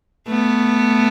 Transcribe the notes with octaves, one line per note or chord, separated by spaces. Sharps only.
A3 B3